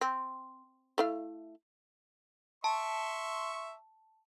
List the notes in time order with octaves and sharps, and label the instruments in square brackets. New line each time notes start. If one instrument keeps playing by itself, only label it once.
[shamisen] C4
A3 E4 F5
[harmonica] E5 C6 C#6 [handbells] A5